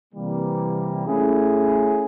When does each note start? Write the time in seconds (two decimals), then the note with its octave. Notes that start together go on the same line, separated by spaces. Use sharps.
0.14 C3 E3 G3 A#3
1.06 A3 C#4 E4 G#4